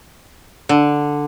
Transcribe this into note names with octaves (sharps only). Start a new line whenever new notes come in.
D3